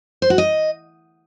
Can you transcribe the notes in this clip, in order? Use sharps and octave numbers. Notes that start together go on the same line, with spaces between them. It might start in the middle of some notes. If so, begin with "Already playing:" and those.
C5
F#4
D#5